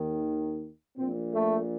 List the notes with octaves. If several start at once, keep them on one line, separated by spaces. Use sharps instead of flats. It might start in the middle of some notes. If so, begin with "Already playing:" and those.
Already playing: D#2 D#3
A#1 A#2 C4
A3